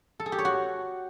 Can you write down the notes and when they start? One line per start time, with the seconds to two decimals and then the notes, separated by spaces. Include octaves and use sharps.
0.20 A4
0.26 G#4
0.32 G4
0.38 C#5
0.45 F#4